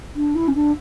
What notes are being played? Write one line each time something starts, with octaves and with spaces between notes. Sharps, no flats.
D4
E4
C#4
D4